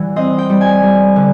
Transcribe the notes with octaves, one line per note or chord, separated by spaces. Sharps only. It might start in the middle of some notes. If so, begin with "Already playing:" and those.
Already playing: E3 G3 F#5
C4 D#5
G5
G3
G#5
G3
D3